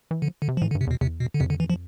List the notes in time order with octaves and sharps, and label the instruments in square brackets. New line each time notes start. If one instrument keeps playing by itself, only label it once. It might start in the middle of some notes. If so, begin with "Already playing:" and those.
[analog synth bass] E3
[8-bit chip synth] D3 [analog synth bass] F3
[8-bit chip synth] D3
[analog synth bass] C3
[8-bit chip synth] F3
[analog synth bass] A2 [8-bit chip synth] E3
[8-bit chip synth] D3
[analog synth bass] G2
[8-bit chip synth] C3
[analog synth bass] E2 [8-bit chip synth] B2
[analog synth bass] E2 [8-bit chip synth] C3
[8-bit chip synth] B2
D3
[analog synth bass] F2 [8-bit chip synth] C3
[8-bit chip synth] D3
E3
F3